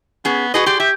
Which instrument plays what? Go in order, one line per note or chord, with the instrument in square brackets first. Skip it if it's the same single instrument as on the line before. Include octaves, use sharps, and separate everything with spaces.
[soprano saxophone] B3 [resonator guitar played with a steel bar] C#4 G#4
[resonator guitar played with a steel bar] F#4 G#4 B4 [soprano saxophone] D#5
[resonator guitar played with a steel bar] G4 G#4 D5 [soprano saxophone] C6
[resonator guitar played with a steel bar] G4 [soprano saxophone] E5